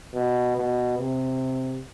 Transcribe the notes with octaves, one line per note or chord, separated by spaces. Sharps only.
B2
B2
C3